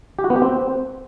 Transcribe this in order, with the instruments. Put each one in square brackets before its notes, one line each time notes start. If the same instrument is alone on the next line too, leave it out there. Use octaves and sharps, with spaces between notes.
[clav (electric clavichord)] G4
F#4
B3
G4
C4